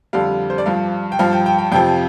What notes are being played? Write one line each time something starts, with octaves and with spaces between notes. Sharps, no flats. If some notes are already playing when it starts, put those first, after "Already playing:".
F2 D3 G3 F5
C5
D5
G2 F3 F5
G5
G2 F3 F5
G5
G5
G5
F2 C3 F3 G5